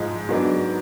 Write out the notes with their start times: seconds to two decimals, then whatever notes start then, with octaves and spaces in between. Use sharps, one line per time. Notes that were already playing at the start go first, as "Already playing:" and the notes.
Already playing: G#2 F3 G#3 D#4
0.29 G#2 F#3 B3 D4